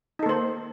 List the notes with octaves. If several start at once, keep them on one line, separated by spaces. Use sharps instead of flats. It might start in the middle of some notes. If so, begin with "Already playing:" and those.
A#3 D#4 A4 C5